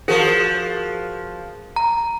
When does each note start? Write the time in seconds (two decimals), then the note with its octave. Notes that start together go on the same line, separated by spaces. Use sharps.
0.08 F3 F#4 G#4 A#4
1.76 A#5